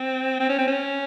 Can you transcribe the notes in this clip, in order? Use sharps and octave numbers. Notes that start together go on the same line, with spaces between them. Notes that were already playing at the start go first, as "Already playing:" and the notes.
Already playing: C4
C4
C#4
C4
C#4